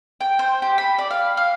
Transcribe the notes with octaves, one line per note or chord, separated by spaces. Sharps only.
G5
C5
G4
B5
D5
F5
F5